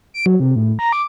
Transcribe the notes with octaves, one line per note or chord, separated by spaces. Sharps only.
D7
F#3
C3
A2
A#5
D6